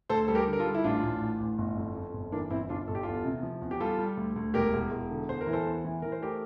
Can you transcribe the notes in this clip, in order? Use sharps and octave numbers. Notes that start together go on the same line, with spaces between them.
D2 A4 C5
G3 A4
G4 A#4
D3
A#4
F4 A4
G3
E4
A1 D4 F4
A1
A1
A1
G1
F2
F2
G1
E3 A#3 D4
G1 C4 E4
G1 D4 F4
G1 A4
G4
E2 F4 A4
C3
F3
E2
G4
G3 F4 A4
G3
D2
D2
E1 G4 A#4
E1
E1
D3
E2 C5
A#4
E3
A4 C5
E2
E3
E3 A#4
C5
A3 G4 A#4